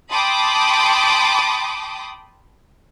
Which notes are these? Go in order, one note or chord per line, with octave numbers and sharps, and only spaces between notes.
G5 A5 B5 C6 D6 D#6